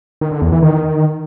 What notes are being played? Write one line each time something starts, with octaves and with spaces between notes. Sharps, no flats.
D#3
D3
E2
E3
D#3